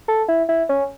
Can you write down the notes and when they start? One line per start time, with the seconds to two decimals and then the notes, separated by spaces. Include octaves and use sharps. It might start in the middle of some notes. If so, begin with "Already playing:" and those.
0.08 A4
0.28 E4
0.49 E4
0.69 C#4